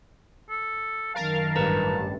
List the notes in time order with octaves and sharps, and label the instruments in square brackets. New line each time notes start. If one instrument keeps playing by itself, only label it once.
[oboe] A4
[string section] F#2 D#3 [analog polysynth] A#4 F5 [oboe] A5
[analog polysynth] A1 G2 [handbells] A#4 B4 A#5